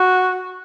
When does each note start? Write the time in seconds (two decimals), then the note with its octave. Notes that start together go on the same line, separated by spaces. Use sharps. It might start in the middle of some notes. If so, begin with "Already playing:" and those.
Already playing: F#4